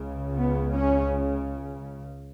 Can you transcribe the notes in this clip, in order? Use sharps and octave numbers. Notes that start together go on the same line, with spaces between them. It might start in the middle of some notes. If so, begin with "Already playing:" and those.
Already playing: C#2 C#3
B3
C#4